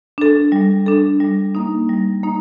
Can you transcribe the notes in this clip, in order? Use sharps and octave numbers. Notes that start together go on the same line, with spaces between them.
D4 A4
G3
D4 A4
G3
A#3 D#4
G3
A#3 D#4